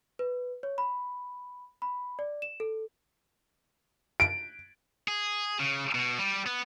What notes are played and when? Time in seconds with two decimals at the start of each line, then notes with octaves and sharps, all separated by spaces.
0.19 B4
0.63 C#5
0.78 B5
1.82 B5
2.19 D5
2.42 E7
2.60 A4
4.20 D7
5.08 G#4
5.59 C#3
5.95 B2
6.18 G3
6.46 B3